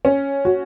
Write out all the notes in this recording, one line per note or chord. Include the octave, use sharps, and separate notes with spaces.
C#4
F#4